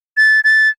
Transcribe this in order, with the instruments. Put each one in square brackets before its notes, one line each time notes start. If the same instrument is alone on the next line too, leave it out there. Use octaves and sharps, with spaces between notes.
[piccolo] A6
A6